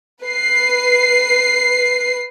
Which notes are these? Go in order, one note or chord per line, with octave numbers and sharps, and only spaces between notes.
B4 C7